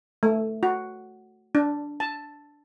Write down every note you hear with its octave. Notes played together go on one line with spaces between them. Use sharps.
A3
F#4
D4
A5